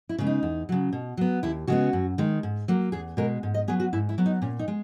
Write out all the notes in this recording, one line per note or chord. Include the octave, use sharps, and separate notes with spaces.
E4
C#3 G#3 B3
D#4
E2
C#3 F#3
B2
F#3 B3
D#2 E4
C#3 G#3 B3 F#4
F#2
D#3 G#3
G#2
F#3 A#3
E2 G#4
B2 G#3 A#4
G#2
D#5
F#3 B3 G#4
F#4
G#2 E4
E4
F#3 B3
D#4
A#2 C#4
D#4
G#3